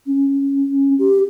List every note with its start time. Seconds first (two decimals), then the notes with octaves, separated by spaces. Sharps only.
0.06 C#4
0.99 G4